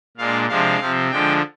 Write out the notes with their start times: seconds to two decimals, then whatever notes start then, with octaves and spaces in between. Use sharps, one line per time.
0.17 A#2 G#3 D4 F5
0.48 C3 F3 G#3 D4 F5
0.80 C3 F3 C4
1.11 D3 F3 G#3 D4 G5